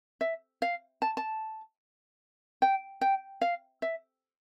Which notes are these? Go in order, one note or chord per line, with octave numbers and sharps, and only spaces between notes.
E5
F5
A5
A5
G5
G5
F5
E5